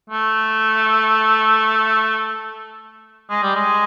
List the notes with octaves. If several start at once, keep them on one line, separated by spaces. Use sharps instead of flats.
A3
G#3
G3
G#3